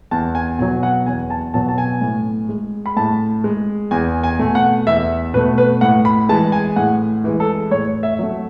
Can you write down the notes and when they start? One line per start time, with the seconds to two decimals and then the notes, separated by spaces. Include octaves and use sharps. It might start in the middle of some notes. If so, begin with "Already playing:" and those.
0.11 E2 A5
0.35 G#5
0.59 B2 G#5
0.62 F#3
0.83 F#5
1.06 E2 G#5
1.30 A5
1.54 B2 F#3 A5
1.68 A5
1.78 G#5
2.01 A2
2.49 G#3
2.86 B5
2.96 A2 A5
3.44 G#3
3.91 E2 G#5
4.23 G#5
4.39 B2 A3
4.55 F#5
4.87 E2 E5
5.34 B2 B4
5.37 A3
5.58 B4
5.81 A2 F#5
6.05 B5
6.29 E3 G#3 A5
6.52 G#5
6.76 A2 F#5
7.24 E3 G#3
7.40 A4
7.71 A2 C#5
8.03 E5
8.19 F#3 A3